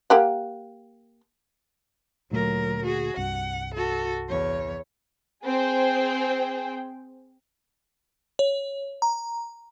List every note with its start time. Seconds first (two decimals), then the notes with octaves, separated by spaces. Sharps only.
0.10 A#3 G4 F#5
2.31 D2 A#2 F#3 A3 A#4
2.84 F#4 G#4
3.17 C2 G2 F#5
3.75 F#4 A4
4.29 E2 C#5
5.45 C4 G#4 C5 G5
8.39 C#5
9.02 A#5